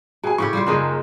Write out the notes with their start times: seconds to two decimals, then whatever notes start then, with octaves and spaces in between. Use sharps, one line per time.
0.24 B2 G#4 G#5
0.38 A2 C#3 G4 C#6
0.53 G3 F4 C5
0.67 F#1 A#3 D#4 G#4